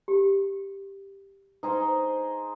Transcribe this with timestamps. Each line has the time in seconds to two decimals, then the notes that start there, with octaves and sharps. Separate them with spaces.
0.08 G4
1.63 D#4 G#4 B4 C5